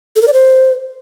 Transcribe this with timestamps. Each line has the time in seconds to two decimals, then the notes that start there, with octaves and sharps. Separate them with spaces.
0.16 A4
0.22 A#4
0.27 D5
0.33 C5